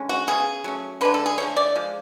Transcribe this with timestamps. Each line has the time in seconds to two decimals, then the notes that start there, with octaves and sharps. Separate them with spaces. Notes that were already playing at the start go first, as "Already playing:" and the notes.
Already playing: D3 G#3 C#4
0.09 F#4
0.27 C#3 F#3 B3 G#4
0.64 F#3 A3 C#4
1.01 D3 G#3 D4 B4
1.14 A4
1.26 G#4
1.38 D3 F3 A3 C#5
1.57 D5
1.76 F3 G#3